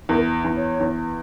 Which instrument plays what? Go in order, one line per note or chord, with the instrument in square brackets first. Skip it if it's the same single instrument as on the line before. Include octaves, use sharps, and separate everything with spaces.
[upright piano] E2 [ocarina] A#4
[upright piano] E2
[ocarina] C#5
[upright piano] E2